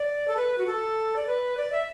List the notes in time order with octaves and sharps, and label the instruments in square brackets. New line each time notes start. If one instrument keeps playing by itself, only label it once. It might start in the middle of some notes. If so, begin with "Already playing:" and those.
Already playing: [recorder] D5
A4
B4
F#4
A4
D5
B4
D5
E5